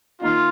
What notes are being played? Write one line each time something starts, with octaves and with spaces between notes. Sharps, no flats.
D#3 A#3 D#4 F4